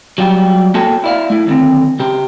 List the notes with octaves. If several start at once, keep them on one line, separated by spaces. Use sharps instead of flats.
F#3 G3 F4 G4
A#3 F#4 A4 C#5 G5 A5
E4 D5 F5
A3 E4
D#2 D3 C4
C#3 G4